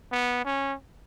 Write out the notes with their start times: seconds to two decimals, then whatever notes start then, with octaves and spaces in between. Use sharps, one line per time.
0.12 B3
0.45 C#4